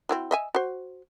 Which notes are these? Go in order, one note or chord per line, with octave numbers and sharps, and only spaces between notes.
C4 E4 F#4
D#5 E5 G#5
F#4 C5